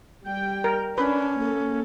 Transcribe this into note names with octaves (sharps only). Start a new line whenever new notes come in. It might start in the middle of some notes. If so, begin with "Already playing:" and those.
G3 G5
A#4
C#4 D4 B4
A#3 A4